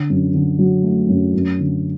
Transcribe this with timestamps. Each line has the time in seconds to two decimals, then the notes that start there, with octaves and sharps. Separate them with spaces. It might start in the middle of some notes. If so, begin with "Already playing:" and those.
Already playing: D3
0.10 F#2
0.34 D3
0.59 F#3
0.83 A3
1.09 F#2
1.34 F#2
1.59 D3